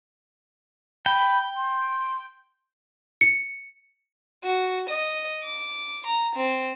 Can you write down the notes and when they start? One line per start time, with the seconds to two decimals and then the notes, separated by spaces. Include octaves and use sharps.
1.06 G5 B5
1.56 C6
3.21 C#7
4.45 F#4
4.90 D#5
5.45 D6
6.07 A#5
6.36 C4